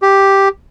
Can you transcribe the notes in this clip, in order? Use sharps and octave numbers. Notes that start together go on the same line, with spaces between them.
G4